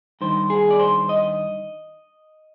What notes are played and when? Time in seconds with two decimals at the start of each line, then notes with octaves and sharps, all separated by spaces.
0.21 G2 D#3 C5
0.50 G#4
0.70 D5
0.79 C5
1.09 D#5